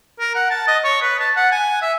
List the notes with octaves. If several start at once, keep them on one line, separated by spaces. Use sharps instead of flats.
A#4
F#5
A5
D#5
C#5
B4
A5
F#5
G#5
E5